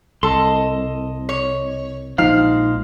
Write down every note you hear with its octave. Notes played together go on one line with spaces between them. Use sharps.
C2 A4 D#5 C6
C#5
A#1 F3 G#3 D#4 F5 F6